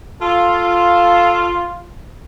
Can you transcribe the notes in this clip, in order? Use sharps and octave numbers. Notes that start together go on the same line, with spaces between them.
F4 A4